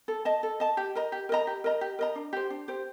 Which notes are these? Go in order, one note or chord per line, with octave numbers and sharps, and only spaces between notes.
A4
D#5 A5
A4
D#5 A5
G4
A#4 D#5 A#5
G4
A#4 D#5 A#5
G4
A#4 D#5 A#5
G4
A#4 D#5 A#5
D4
G4 C5
D4
G4 C5